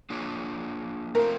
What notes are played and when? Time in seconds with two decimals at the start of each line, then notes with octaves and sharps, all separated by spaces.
0.10 A#3 D4 F4 G#4 C#5
1.15 A3 C4 F4 A#4